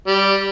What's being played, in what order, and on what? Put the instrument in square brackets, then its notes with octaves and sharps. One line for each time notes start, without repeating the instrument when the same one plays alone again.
[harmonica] G3